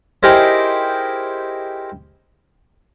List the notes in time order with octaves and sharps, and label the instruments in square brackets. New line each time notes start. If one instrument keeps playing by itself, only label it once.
[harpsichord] D#4 E4 G4 G#4 A#4 C5